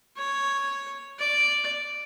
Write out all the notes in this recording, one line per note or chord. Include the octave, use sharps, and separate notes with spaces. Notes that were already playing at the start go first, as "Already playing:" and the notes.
C#5
D5